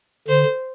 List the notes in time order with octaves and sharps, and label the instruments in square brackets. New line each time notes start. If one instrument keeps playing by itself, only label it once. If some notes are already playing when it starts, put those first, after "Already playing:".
[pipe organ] D3 [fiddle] C5